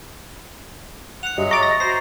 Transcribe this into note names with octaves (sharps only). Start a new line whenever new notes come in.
F#5 F#6 C#7 F7
G2 F#3 G#3 C#5 D#5 E5
A#5 C#6 D6 A6 F7
A#6
F#4 C5 A#5 C7